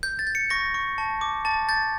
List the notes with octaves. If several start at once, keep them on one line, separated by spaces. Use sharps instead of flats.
G6
A6
G6
C#7
C#6 A#6
C#6
A5
D6
A5 A6
G6 A6